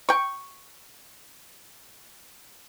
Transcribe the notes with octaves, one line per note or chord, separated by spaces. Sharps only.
G5 C#6